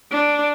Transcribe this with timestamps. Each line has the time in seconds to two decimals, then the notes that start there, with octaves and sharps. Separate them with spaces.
0.11 D4